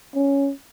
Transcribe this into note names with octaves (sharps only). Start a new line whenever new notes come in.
C#4